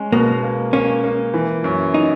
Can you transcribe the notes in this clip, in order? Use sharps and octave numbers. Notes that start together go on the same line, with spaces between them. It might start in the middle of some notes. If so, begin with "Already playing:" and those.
Already playing: G#3 C#4
B2 A#3
A#3
A#3 C#4
A#3
E3
F#2
D#4